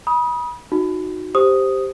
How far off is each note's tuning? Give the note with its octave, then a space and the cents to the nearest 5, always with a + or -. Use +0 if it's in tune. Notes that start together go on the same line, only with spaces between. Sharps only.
B5 -35 D#6 +10
D#4 +0 F#4 -15
G4 +0 C5 +0 D#6 +0